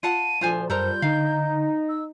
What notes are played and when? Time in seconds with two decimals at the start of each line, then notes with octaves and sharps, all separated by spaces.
0.03 F4 F#5 A5 D#7
0.41 D2 A#2 F3 F4 C5 G#5
0.70 F#2 G3 F4 A4 A#4 C5 A#5 G6
1.02 D3 D#4 F5
1.89 E6